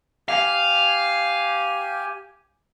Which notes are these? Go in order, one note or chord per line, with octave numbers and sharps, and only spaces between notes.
G4 F5 G#5